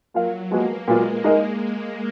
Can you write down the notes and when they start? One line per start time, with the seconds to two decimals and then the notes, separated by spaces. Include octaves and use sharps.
0.14 F#3 A#3 F4 A#4 F5
0.51 F3 G#3 A#3 B3 F#4
0.87 A#2 F#3 G#3 B3 F4
1.24 G#3 D#4 A#4 D#5